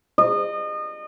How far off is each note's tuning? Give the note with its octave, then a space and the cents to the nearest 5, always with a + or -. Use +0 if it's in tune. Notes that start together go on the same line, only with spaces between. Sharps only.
D#5 -30